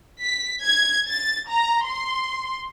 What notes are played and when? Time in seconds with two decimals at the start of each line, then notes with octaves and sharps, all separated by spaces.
0.22 B6
0.64 G#6
1.09 A6
1.50 A#5
1.88 C6